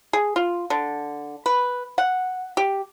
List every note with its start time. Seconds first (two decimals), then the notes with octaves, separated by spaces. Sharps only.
0.13 G#4
0.36 F4
0.70 D3
1.46 B4
1.98 F#5
2.57 G4